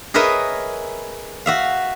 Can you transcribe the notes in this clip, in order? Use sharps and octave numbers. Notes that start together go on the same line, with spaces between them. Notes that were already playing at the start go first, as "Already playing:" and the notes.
G#4 A#4 B4 C#5 D#5 E5
F#4 E5 F5